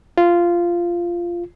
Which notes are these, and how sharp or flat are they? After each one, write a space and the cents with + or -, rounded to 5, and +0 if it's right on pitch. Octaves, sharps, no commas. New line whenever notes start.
F4 -10